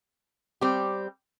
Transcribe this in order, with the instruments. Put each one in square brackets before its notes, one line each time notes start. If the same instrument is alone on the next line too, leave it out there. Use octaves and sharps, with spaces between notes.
[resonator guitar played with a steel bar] G3 C4 G4